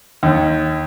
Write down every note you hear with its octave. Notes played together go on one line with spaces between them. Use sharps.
D#2